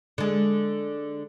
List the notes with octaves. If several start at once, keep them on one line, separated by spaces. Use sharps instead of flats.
D3 G#3